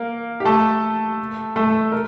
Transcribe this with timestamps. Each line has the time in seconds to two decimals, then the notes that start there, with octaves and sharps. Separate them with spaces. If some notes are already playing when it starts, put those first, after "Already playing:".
Already playing: A#3 A#4
0.40 G4
0.45 A3 A4
1.56 A3 A4
1.92 A#4